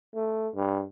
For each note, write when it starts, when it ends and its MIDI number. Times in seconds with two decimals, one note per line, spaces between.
0.15 0.48 57
0.55 0.83 43